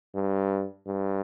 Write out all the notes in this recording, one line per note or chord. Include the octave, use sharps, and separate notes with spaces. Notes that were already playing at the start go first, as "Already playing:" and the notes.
G2
G2